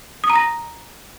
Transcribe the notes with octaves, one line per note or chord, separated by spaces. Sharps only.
D#6
A#5
A#6